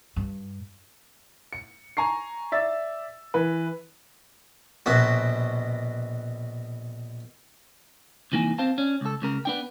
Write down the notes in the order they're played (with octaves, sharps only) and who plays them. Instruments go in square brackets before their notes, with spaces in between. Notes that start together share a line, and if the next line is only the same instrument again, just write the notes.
[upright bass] G2
[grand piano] C#7
G#5 A#5 C#6 C7
D5 E5 E6 A6
E3 B4
[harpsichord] A#1 B2 F#4
[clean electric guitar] C2 F2 E3 A#3 D#4 G#5
C4 C5 F5 A5
C#4 D4
C#2 A4
C#2 C#3 A#4
B3 D4 G5